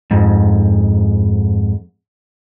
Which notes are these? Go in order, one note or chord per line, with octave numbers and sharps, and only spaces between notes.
F2 G#2